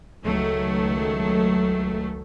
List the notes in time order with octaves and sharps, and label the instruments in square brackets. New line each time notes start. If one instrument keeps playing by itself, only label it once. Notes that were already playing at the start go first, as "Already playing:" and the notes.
[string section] C#2 D#3 F#3 A3